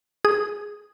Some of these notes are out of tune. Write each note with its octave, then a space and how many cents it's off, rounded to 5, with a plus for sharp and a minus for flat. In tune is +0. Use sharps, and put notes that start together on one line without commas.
G#4 +0 D#6 +0